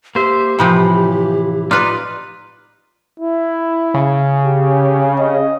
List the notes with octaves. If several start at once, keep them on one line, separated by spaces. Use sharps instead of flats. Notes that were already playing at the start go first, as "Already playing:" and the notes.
A#3 G4 C5 E5
A2 C3 E3 F3 B5 G6
D#4 F4 B4 D5
E4
C#3
G4
D#5